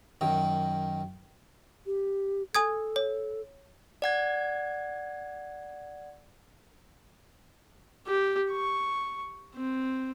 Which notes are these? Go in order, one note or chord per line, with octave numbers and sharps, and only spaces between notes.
F#2 D#3
G4
A4 G#5 D#6 G#6
C#5
D5 F#5 G#6
G4
C#6
C4